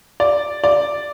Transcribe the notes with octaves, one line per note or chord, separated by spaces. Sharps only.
D5
D5